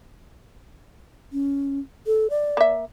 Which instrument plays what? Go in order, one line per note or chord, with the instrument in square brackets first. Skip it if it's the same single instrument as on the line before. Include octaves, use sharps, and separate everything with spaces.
[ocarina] C#4
A4
D5
[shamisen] A#3 E5